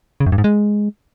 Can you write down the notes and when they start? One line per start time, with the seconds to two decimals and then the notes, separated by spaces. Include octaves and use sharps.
0.20 C#3
0.26 F#2
0.32 G2
0.38 G#2
0.44 G#3